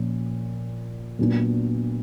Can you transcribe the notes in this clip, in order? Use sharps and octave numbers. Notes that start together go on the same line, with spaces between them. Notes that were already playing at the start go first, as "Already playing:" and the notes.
Already playing: A#2 F3 C#4
A#2 F#3 B3 D4